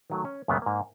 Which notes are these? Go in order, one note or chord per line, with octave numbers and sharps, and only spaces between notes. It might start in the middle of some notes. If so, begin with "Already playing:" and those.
D#3 F#3 A3
C#4
F#2 A#2 C#3 A3 B3
G#2 A#3